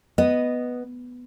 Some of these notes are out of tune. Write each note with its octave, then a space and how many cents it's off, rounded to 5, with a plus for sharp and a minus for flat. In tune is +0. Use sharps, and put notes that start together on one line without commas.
B3 +0 D#5 +0